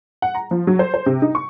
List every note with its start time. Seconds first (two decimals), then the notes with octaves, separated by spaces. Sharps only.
0.22 F#5
0.35 A#5
0.51 F3
0.67 F#3
0.79 C5
0.94 C5
1.06 C3
1.22 D#4
1.35 C#6